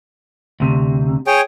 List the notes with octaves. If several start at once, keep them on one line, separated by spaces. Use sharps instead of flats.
D2 C3
G#4 C#5 G5